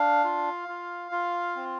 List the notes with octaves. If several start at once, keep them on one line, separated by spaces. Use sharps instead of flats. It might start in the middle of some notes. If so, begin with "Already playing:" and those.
Already playing: D4 F5
F4
F4
F4
C4